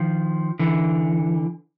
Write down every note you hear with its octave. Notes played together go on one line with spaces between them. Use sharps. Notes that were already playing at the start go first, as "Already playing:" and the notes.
Already playing: D#3 F3
D3 E3